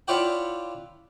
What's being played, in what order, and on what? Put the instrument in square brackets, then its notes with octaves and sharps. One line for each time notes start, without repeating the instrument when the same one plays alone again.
[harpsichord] E4 F4 C#5 D5 F#5 G5